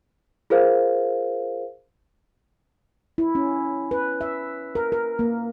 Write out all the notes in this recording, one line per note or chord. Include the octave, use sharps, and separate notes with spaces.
F4 G#4 A#4 C5 F5
E4
C#4
B4
E5
A#4
A#4
A#3